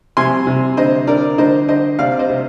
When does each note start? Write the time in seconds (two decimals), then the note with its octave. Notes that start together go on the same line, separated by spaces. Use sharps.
0.17 C3 G#5 C6
0.47 C3
0.77 D3 C5 D#5
1.07 D3 A#4 D5
1.38 D3 C5 D#5
1.68 D3 C5 D#5
1.99 C3 D5 F5
2.19 C5 D#5
2.29 C3